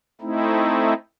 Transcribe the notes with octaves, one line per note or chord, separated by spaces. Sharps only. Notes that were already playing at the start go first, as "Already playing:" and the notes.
A3 C4 D#4 E4